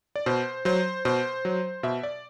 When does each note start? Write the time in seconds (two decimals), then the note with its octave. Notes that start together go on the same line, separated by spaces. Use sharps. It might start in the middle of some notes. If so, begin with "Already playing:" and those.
0.16 D5
0.26 B2 C5
0.65 F#3 C5
1.05 B2 C5
1.45 F#3
1.83 B2 E5
2.03 D5